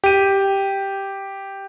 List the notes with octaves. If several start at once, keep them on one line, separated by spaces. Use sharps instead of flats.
G4 D#7